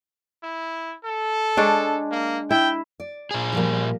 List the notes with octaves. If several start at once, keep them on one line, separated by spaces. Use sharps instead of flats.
E4
A4
G#3 D4 C#5
A#3
E4 G5
D5
A#2 G#4
F3 G3 A#3